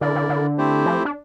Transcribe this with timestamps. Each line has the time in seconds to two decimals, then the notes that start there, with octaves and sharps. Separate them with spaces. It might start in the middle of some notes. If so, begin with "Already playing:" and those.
0.01 D3 E4 A#4 D5
0.15 D3
0.29 D3
0.58 A3 C4 E4 G4 C5
0.86 F3
1.05 D4